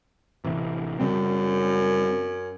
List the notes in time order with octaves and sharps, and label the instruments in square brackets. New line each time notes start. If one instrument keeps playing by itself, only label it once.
[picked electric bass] A1 C3 E3
[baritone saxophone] F#2 [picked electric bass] C#3 G3 C4